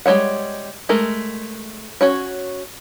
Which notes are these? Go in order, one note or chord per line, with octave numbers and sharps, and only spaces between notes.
G3 G#3 D4 C#5 F#5
G#3 A3 A#4
C#4 F#4 C#5